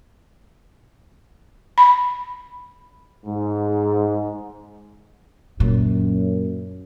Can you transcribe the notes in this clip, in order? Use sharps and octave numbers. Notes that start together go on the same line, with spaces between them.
B5
G#2
F#2 A#2